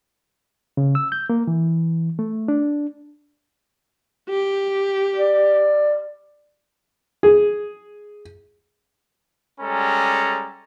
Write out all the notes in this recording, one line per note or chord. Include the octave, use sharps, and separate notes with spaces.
C#3
E6
G6
A#3
E3
A3
D4
G4
D5
G#4
G3 G#3 C#4 A4 A#5